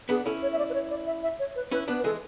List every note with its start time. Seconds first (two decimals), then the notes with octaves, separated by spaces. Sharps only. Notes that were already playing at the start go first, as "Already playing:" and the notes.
0.09 B3 D4 G#4
0.26 C#4 E4 A4
0.43 C#5
0.53 E5
0.59 D5
0.70 B4
0.74 C#5
0.90 D5
1.07 E5
1.23 E5
1.39 C#5
1.56 B4
1.71 C#4 E4 B4
1.88 B3 D4 B4
1.99 B4
2.04 E3 G#3 A4